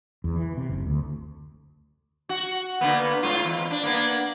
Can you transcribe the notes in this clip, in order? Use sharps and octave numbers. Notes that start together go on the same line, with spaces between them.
E2
E3
C3
F#1
D2
F#4
D3 A#3 B3
G#2 F4
E2
D4
A#3 B3 D4